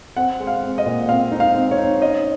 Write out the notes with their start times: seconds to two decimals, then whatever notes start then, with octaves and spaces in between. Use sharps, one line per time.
0.17 C4 F#5
0.40 G#3
0.47 F5
0.63 C4
0.78 D#5
0.86 A#2
1.09 C4 F5
1.31 D#4
1.40 F5
1.55 C4
1.71 C#5
1.78 D#4
2.02 C#4 D#5